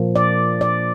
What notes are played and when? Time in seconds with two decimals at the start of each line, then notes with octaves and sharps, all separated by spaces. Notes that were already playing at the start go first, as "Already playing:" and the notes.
Already playing: A#2 F3 A#3
0.15 D5
0.61 D5